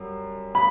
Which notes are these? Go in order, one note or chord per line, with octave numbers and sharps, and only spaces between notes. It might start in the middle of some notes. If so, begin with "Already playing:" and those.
Already playing: F#2 G3
B5